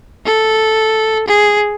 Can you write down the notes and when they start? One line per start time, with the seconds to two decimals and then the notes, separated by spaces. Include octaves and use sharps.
0.25 A4
1.28 G#4